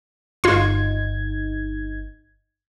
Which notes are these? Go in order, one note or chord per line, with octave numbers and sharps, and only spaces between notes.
G1 D#4 F4 C6 G#6